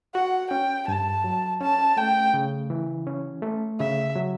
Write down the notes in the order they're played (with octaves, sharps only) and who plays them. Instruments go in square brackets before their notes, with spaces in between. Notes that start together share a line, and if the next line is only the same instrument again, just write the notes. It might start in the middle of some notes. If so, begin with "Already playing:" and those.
[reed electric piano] F#4 [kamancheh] F#5
[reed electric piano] C#4 [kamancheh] G5
[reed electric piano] G2 [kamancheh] A5
[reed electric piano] F#3
[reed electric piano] C#4 [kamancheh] A5
[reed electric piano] A3 [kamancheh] G5
[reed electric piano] C#3
E3
C#4
A3
[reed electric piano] C#3 [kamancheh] E5
[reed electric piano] F#3